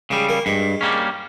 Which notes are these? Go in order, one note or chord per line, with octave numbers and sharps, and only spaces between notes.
C#3 G3 G#3
A#3
G2 G#3
G3 A#3 C#4